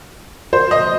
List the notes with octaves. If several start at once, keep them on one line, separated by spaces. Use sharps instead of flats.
C5
D#5